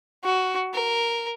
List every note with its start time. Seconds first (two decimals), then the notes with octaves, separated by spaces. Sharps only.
0.24 F#4
0.74 A#4